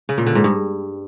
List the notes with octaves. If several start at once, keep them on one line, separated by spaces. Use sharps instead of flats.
C#3
A#2
D3
G#2
G2